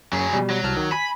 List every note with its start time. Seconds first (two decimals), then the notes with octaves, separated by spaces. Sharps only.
0.13 F#2 F#3 G#4 C#5
0.33 B2 G3
0.50 F#3
0.64 C2 A5 F6
0.77 D#3
0.92 G#5 B5